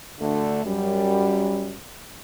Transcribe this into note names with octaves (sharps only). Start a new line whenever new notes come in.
D2 D3 A3
F#2 G3